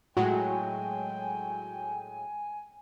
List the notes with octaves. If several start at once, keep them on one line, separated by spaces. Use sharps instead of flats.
A2 F#3 G#3 F#4 G5 G#5